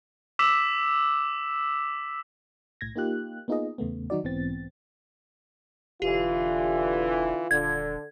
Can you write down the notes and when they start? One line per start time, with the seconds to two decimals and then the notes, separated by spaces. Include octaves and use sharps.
0.39 D6 E6 B6 E7
2.81 B1 A2 G#6 A#6
2.96 A#3 D#4 F4 G4 F#6
3.48 A#3 B3 D#4 F4 G#4 D#5
3.78 E2 C#3 A3 B3
4.10 D#3 F#3 D#4 F#4 D5
4.24 B1 G#2 E3 B3 C4 A6
6.02 E1 D3 E3 F4 G4
7.51 D#1 D3 G#6